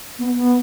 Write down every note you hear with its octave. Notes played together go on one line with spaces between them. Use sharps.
B3
B3